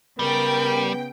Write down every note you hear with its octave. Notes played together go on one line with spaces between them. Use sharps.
C#3 G3 B3 A#4 G5